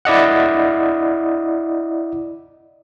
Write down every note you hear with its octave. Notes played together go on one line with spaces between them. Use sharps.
E4 D5 D#5 F#5